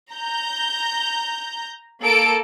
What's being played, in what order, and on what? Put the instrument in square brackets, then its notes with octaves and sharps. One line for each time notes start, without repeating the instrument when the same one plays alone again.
[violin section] A#5 G6
A#3 A4 D7